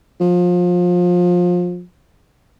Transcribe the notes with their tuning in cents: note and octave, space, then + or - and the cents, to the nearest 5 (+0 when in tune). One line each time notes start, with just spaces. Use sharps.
F3 +25